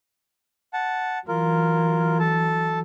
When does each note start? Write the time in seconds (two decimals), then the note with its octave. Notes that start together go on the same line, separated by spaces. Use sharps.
0.73 F#5 A5
1.28 E3 F#3 F4 A#4
2.19 A4 A5